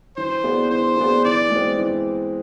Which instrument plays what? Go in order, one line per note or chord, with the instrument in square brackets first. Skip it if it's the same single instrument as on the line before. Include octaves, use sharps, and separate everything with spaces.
[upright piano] E3 [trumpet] C5
[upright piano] B3 E4 G#4 D5
[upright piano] E3 [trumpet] C5
[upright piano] B3 E4 G#4 D5
[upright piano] E3 [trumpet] D5
[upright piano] G#3 C4
E3